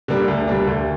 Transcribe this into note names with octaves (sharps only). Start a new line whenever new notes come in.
D3 G3 A#3 D4
D2
D3 G3 A#3 D4
D2